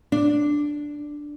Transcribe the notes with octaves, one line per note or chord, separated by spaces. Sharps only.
D4